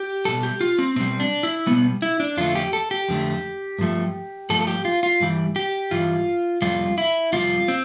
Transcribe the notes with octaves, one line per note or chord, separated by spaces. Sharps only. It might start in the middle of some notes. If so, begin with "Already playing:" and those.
Already playing: G4
B2 G3 A4
G4
F4
C4
B2 G3 C4
D4
E4
B2 G3 B3
E4
D4
F2 D3 A3 F4
G4
A4
G4
F2 D3 A3
G2 F3 A3
G2 F3 A3 A4
A4
G4
F4
F4
G2 E3 G3
G4
G2 E3 G3 F4
F2 C3 G3 F4
E4
F2 C3 G3 F4
C4